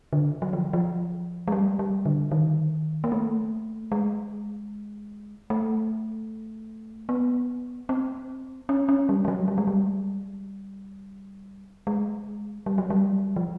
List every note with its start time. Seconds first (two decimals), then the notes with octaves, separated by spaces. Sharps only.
0.13 D3
0.42 F#3
0.53 F3
0.73 F3
1.48 G#3
1.52 G3
1.79 G3
2.06 D3
2.32 D#3
3.04 A#3
3.12 A3
3.92 G#3
5.50 A3
7.09 B3
7.89 C4
8.69 C#4
8.89 C#4
9.09 G3
9.25 G3
9.28 F#3
9.48 G3
9.58 G#3
9.67 G3
11.87 G#3
12.66 G3
12.78 F#3
12.90 G3
13.36 F3